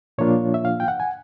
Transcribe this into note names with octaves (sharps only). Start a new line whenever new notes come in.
A#2 F3 A#3 D4 F4 C#5
E5
F5
G5
F#5
G#5